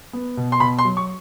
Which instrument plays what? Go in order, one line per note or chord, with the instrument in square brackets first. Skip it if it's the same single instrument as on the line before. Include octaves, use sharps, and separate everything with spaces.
[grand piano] B3
B2
C6
B2 B5
C6
F#3
C#6